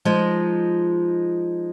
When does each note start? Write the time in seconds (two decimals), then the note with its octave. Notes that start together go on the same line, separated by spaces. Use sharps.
0.05 F3 G#3 D#4